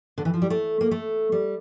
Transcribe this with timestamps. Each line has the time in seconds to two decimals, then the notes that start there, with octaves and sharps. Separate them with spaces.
0.18 D3
0.25 E3
0.34 F3
0.42 G3
0.50 A3
0.81 A#3
0.91 A3
1.32 G3